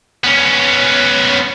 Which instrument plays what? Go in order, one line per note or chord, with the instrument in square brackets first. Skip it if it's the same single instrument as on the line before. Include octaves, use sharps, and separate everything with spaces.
[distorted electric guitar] B3 C#4